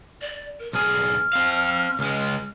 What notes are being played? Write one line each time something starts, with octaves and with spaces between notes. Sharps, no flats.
D5
A#4
B1 G#4 F6
C4 F5
C#2 G#3